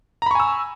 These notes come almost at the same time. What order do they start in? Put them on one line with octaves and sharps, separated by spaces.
A#5 B5 C#6 G#5 E6